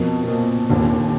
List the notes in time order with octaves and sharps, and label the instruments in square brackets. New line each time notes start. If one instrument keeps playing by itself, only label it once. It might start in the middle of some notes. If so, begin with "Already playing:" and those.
Already playing: [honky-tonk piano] F2 F3 A#3 [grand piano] B2
[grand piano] B2
A#2
[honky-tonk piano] F1 D#2 D3 [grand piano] A#2